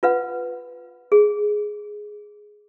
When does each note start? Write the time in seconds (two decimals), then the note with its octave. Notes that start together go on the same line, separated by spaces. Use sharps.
0.03 F4 B4 F#5
1.12 G#4